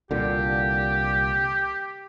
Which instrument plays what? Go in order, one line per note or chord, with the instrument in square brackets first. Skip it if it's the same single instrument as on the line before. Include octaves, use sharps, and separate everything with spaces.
[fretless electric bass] C2 A#2 D3 [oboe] G4